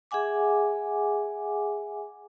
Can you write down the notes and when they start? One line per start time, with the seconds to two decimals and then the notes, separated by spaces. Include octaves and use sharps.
0.11 G#4 E5 F#5 G#5 D6